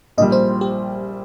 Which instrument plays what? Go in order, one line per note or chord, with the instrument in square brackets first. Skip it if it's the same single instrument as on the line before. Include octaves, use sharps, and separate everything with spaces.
[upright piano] A#1 A#2 G3 [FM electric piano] D#5
[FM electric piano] C5
G4